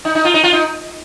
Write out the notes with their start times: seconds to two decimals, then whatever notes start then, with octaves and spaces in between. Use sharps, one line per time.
0.05 D#4
0.15 D#4
0.25 F4
0.34 D#4
0.44 F4
0.53 D#4